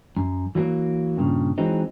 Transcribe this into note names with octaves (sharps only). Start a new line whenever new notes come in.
F#2
E3 F#3 G3 A#3
G2 A#2 C#3
E3 F#3 G#3 C4 D#4